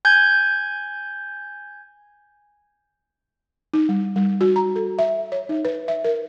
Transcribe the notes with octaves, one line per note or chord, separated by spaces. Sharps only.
G#5 G6 G#6
D#4
G3
G3
F#4
A#5
A4
E5
C#5
D#4
B4
E5
A#4